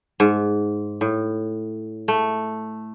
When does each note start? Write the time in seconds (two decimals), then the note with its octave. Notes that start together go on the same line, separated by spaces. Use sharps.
0.20 G#2
1.01 A2
2.08 A3